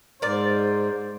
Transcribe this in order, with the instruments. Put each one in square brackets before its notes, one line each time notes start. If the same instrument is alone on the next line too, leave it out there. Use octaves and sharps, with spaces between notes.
[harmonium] G#2 [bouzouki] A#4 D5 [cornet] C5